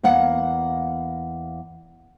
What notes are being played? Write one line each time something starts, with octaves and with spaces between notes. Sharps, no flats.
E2 A#3 F5 F#5